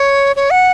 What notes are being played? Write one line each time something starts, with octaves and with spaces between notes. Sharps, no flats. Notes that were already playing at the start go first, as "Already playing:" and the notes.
Already playing: C#5
C#5
F#5